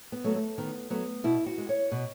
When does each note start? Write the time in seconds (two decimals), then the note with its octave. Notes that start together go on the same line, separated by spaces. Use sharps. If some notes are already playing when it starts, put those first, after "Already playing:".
0.12 B3
0.24 F#3 A3
0.35 A3
0.58 D#3 B3
0.90 F#3 A3 B3
1.24 B2 E4
1.46 F#4
1.58 G#3
1.69 C#5
1.92 B2